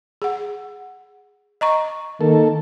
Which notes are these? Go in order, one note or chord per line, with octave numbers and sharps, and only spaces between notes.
G#4 F#5
D#5 A#5 C#6
D#3 A#3 A4